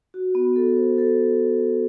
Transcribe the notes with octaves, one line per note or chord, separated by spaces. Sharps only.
F#4
B3
A4
C5
A4